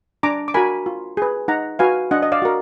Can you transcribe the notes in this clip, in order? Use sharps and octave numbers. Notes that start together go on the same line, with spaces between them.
D4 A#5 D6
D6
F#4 A#4 G#5 B5
F4
G#4 B4
D#4 F#5 A#5
F#4 B4 F5 G#5
D4 D#5 F#5
D#5
D5 F5
F#4 A#4